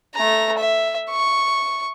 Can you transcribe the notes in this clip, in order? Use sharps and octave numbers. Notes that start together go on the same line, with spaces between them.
A3 A#5
E5
C#6